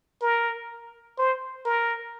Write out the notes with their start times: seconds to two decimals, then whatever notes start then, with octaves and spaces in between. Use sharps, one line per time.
0.22 A#4
1.18 C5
1.65 A#4